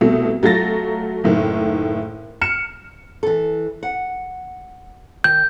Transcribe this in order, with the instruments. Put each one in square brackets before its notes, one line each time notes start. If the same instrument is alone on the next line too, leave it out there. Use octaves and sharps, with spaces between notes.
[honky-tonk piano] C2 B2 A3
F#3 A3 F4 A6 A#6
F#1 A2 D#3
F6 C#7 E7
[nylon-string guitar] E3 A4
F#5
[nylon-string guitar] D#3 [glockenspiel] G6